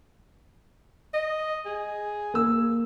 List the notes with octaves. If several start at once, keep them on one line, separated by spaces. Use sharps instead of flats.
D#5
G#4
A#3 E6